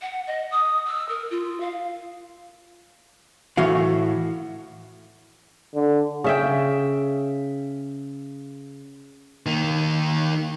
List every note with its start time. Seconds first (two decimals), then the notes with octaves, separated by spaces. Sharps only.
0.01 F#5
0.27 D#5
0.51 D#6
0.86 E6
1.09 A#4
1.30 F4
1.60 F5
3.57 A2 E3 F#4 F5
5.75 D3
6.24 C#3 E5 G5
9.46 D#3 A#3